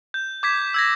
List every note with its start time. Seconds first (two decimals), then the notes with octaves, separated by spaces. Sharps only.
0.14 G6
0.43 D6 G#6 B6
0.74 E6 G#6 A#6